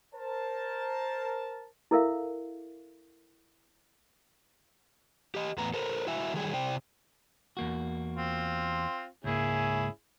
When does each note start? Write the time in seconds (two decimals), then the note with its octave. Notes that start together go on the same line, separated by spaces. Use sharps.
0.13 A#4 C5 A5
1.91 E4 A4 A#4 E5 F5
5.35 G4 D#5
5.58 E2 A2 B3 A#5
5.74 A4 A#4 C5
6.07 E4 F#4 E5 G#5
6.34 D#3 F#3 G3 G#4 G#5
6.54 C3 C5 D5 G5
7.57 E2 A#3 F#4
8.16 C4 F4
9.24 C#2 G#2 A#3 C#4 E4 G#4